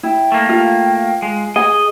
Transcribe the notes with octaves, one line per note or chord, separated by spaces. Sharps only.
E4 G5
A3 A#3
F4
G#3
G#4 D#5 G#5